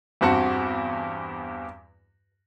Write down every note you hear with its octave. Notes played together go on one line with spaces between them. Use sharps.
E2 G2 C4 F#4 A5 C#7